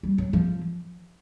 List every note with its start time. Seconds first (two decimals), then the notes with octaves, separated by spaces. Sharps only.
0.03 G3
0.18 F#3
0.33 F3